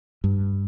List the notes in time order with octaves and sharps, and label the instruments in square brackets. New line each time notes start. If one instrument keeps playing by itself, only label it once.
[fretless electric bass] G2